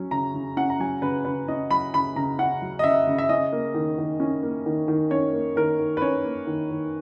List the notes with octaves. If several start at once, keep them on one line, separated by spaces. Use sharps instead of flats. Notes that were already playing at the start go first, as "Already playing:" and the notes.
Already playing: F#3 C#4
C#3 A#5
C#3
C#4 F#5
A#5
F#3 G#5
C#3 B4
C#3 B4
C#4 D#5
F#3 B5
C#3 B5
C#3 A#5
C#4 F#5
F#3
D#5
C#3 E5
C#3
E5
C#4 D#5
A#3
D#3
D#3
C#4
A#3
D#3
D#3
C#4 C#5
A#3
D#3 A#4
D#3
B4
C#4 C#5
A#3
D#3
D#3